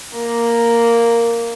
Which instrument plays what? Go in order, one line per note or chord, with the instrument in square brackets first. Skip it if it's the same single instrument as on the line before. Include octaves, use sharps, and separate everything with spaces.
[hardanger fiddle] A#3